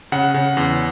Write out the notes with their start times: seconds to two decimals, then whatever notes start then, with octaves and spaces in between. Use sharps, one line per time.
0.12 C#3 F#5
0.34 C#3
0.57 E2